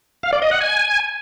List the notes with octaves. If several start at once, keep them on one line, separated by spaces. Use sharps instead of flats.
F5
D5
D#5
F#5
G#5